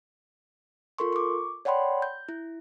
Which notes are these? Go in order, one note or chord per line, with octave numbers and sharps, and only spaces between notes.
F4 A4 A#4 C6 C#6
C#6 D6
C#5 D5 F#5 G5 B5 C6
G6
E4